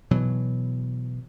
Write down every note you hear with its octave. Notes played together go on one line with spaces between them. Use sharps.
B2 E3 F#3